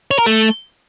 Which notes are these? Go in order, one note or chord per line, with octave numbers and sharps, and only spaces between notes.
C#5
A#4
A3